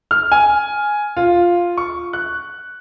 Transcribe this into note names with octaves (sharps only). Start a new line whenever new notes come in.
F6
G#5
F4
C#6
F#6